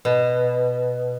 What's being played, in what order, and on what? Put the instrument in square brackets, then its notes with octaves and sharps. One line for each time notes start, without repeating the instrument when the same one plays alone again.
[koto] B2